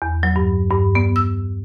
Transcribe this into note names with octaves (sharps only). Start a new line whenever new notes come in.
E2
F#3
G2
G2
B3
E6